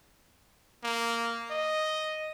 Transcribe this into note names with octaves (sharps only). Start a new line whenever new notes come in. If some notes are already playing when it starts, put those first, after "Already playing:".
A#3
D#5